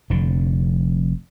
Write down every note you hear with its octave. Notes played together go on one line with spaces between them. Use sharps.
F1 F2 D3